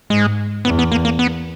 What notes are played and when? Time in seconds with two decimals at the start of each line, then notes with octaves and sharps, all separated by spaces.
0.10 G#2 G#3
0.65 E2 B3
0.79 B3
0.91 A#3
1.05 A#3
1.19 B3